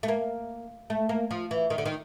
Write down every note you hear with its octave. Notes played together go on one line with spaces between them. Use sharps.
A3
A#3
A3
A#3
F3
E3
D#3
D3
D#3